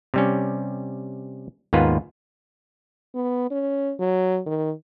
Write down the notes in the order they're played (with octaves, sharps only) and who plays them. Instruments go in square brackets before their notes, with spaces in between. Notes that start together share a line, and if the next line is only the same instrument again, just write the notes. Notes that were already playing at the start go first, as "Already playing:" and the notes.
[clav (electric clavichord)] C3 G3 C#4
D#2 G#2 A#3 B3 F4 B4
[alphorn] B3
C#4
F#3
D#3